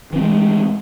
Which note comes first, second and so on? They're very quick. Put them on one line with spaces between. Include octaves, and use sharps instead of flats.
E3 C4 G#3